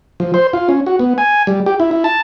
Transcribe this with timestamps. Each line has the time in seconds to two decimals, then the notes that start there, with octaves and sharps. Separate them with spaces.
0.20 F3
0.34 C5
0.53 F4
0.69 C#4
0.86 F#4
0.99 B3
1.18 G#5
1.47 G3
1.66 G4
1.80 E4
1.91 E4
2.04 A5